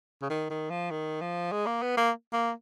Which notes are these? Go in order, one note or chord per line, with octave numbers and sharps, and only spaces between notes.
C#3
D#3
D#3
F3
D#3
F3
G#3
A#3
B3
A#3
A#3